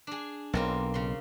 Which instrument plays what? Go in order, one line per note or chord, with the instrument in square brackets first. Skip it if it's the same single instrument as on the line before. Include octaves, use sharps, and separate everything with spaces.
[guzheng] D4 G#4
[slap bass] B1 [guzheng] A#3 C4 F4
[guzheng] C#3 C6